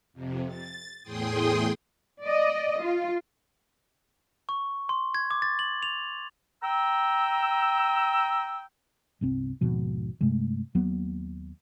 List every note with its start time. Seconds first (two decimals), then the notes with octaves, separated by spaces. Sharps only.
0.13 F2 C3
0.47 A6
1.03 E2 A2 G#4 G5 C6 D#6
2.23 D5 D#5
2.80 F4
4.49 C#6
4.89 C6
5.15 G#6
5.31 D6
5.42 A6
5.59 F#7
5.83 F7
6.63 G5 A#5 E6
9.21 G1 C2 C4
9.61 G#1 D#2 B2 F3
10.21 G2 C3 G#3 A3
10.75 D#2 F#3 A#3 B3